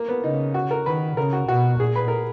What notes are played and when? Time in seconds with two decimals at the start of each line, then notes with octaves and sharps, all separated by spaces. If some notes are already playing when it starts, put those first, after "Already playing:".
Already playing: A#3
0.09 B3
0.23 C#3 D#4
0.54 F#4
0.71 A#4
0.86 D#3 B4
1.17 C#3 A#4
1.33 F#4
1.48 B2 F#4
1.80 A#2 G#4
1.96 B4
2.08 A#4